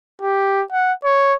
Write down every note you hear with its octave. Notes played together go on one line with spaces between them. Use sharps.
G4
F#5
C#5